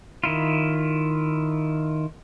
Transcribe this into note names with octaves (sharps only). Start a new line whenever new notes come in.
D#3 E4 F4